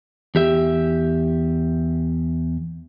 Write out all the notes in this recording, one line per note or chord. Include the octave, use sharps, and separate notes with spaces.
E2 G4 E5